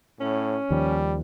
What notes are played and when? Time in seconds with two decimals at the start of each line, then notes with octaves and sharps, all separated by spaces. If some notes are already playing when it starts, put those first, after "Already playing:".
0.20 A2 C#4
0.71 D#2 D#3 F3 G3